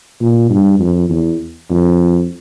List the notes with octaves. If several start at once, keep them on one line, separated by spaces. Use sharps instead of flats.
A#2
G2
F2
E2
F2